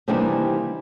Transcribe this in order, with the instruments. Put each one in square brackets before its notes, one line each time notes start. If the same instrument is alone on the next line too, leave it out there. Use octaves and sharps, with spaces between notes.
[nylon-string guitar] C3 D#3 E3 G3 A#3 D4